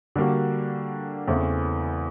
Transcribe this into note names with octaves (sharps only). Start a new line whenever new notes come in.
D3 G3 A#3 D4 F#4
E2 C#3 E3 A3 C4